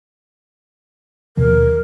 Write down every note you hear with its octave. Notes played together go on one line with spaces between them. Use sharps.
D#2 B2 F3 A#4